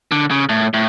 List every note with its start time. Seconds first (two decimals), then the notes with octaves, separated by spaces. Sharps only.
0.12 D3
0.31 C#3
0.49 A2
0.74 A2